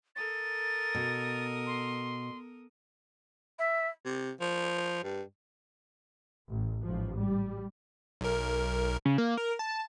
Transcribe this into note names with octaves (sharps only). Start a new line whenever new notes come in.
A4 A#4 D#6 A6
B2
C6
E5
C3
F3
G2
A1
A1 G#2 F3
G3
B1 A#4
C#3
A#3
A#4
A5